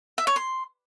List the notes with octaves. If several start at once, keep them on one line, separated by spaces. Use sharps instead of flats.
E5
C#5
C6